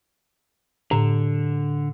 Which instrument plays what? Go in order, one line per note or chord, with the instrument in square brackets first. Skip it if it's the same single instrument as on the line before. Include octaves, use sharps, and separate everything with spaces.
[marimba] A2 [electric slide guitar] D3